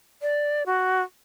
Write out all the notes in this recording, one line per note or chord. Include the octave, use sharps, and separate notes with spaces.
D5
F#4